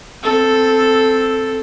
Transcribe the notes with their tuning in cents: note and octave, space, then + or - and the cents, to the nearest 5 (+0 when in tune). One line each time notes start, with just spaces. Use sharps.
C4 +0 A4 +0